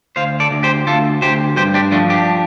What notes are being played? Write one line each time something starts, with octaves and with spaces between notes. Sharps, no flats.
D2 C5 F5
A4 D5
D2
G4 C5
D2 F4 A4
D2 G4 C5
G2 G4 C5
D4 G4
F3 A3 D4
D4 G4